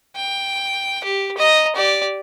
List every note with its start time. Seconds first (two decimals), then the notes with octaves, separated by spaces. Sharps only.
0.16 G5
1.04 G4
1.37 D#5 A#5
1.76 G4 D5